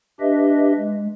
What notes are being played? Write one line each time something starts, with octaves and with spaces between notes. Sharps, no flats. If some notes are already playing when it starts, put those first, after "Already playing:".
D4 G4 B4 D#5 E5
G#3